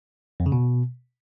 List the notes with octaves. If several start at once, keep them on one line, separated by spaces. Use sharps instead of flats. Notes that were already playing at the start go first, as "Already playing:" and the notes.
F2
C#3
B2